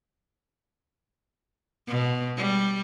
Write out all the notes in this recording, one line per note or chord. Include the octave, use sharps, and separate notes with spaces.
B2
G3